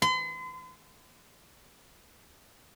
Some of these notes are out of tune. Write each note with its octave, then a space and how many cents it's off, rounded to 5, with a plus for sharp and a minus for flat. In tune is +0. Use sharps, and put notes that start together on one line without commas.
C6 -45